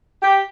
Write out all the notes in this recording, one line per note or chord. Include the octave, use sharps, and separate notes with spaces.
G4